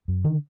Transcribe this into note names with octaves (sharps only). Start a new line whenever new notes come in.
F#2
D3 D#3